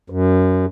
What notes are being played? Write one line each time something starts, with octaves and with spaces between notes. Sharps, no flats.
F#2